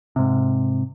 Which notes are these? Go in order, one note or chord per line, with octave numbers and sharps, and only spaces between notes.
G#2 C3